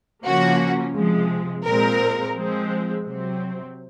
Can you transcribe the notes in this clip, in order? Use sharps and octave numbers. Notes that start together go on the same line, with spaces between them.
C#3 F3 A#3 C#4 F#4
C3 F3 G#3
A#2 G#3 C4 A#4
F3 G#3 C4
C3 F#3 C4